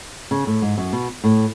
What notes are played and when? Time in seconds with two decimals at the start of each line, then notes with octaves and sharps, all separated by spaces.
0.31 C#3
0.47 A2
0.62 G#2
0.78 F#2
0.93 B2
1.24 A2